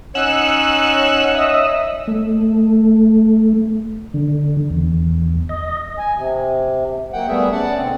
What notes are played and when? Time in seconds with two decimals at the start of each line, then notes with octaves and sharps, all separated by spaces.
0.15 C#4 D#4 C#5 F#5 E6 F#6
1.35 D#5 E5
2.07 A3
4.14 D3
4.70 E2
5.49 D#5
5.98 G#5
6.16 C3
7.13 F#3 A#3 F#5 G5
7.28 G3 A3 B3 G#4 E5
7.52 C#4 D5 F#5 A5
7.76 B2 D3 C4